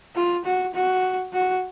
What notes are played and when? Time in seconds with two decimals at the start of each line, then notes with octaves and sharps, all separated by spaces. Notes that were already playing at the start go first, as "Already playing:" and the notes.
0.16 F4
0.45 F#4
0.74 F#4
1.33 F#4